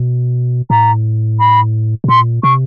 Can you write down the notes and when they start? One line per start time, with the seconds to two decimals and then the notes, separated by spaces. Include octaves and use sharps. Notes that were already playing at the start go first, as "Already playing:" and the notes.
Already playing: B2
0.70 A2 A#5
1.40 B5
2.04 B2
2.08 A#2 C6
2.43 C3 C#6